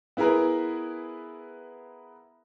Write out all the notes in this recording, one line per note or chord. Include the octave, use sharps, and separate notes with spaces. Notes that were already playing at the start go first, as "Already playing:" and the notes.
B3 E4 G#4 A#4 B4